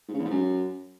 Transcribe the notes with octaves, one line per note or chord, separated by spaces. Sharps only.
G#2
C#3
E2
G#2
F#2